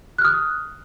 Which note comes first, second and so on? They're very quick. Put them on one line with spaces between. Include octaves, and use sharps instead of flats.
F#6 F6 D#6